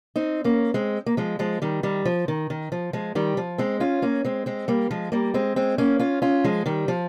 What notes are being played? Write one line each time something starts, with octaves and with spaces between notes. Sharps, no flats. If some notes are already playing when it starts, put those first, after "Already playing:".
C4 D#4
A#3 C#4
G#3 C4
A#3
F3 G#3
F3 G#3
D#3 G3
D#3 G3
F3
D#3
D#3
F3
F3 G#3
D#3 G3
F3
G#3 C4
C#4 F4
A#3 C#4
G#3 C4
G#3 C4
G3 A#3
F3 G#3
G3 A#3
G#3 C4
G#3 C4
A#3 C#4
C#4 F4
C#4 F4
F3 G#3
D#3 G3
F3